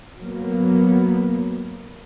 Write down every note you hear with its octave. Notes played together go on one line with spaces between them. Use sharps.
F#3 A#3 B3